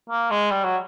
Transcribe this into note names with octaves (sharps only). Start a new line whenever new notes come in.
A#3
G#3
G3
F#3